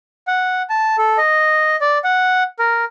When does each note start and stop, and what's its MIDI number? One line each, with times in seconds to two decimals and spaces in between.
0.27 0.62 78
0.70 0.96 81
0.98 1.18 69
1.18 1.76 75
1.81 1.98 74
2.04 2.43 78
2.59 2.85 70